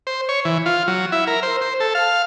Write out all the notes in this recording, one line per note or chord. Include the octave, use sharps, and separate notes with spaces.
C5
C#5
E3
F4
F#3
E4
A#4
C5
C5
A4
F5